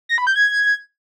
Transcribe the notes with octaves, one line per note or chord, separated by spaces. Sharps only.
A#6
B5
G6
G#6